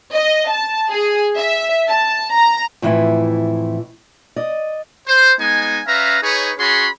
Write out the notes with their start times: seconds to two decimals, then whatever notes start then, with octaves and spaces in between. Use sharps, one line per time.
0.13 D#5
0.50 A5
0.91 G#4
1.37 E5
1.88 A5
2.33 A#5
2.82 F2 A2 E3 E4
4.36 D5 D#5
5.07 C5
5.39 G#3 B3 D#4 G#5
5.87 C#4 B4 E5 F5 A#5
6.23 D#4 G#4 B4 C#5
6.59 C#4 F#4 G#4 C#5 B5 C6